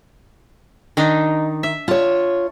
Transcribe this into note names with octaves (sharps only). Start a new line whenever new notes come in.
D#3 D4 D#4
E5
F4 C#5 A5